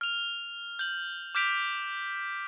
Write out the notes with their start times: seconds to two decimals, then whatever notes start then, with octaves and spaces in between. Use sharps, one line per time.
0.01 F6 F7
0.79 G6 F#7
1.35 D6 F6 G6 B6 D7 F7